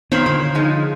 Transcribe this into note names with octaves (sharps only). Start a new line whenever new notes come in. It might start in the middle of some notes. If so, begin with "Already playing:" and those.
A#2 D#3 B3 C5 C#5 B5
D3 B5
F3 G#3 D#4